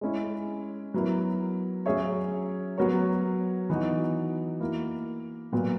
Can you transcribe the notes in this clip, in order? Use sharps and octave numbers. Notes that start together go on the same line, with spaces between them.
G#3 C#4 E4
F#3 B3 E4 A#4
F#3 C#4 G#4 C#5 E5
F#3 B3 F#4 A#4 C#5
E3 B3 D#4 F#4
A#3 E4 A#4
A#2 F#3 B3